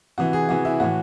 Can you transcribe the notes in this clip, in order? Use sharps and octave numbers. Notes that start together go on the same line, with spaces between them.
C3 E3 F#4
G#4
C3 E3 F#4
E4
A2 E3 F#4